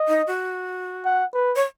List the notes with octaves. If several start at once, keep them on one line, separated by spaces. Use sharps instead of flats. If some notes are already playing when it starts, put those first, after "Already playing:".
Already playing: D#5
D#4
F#4
F#5
B4
C#5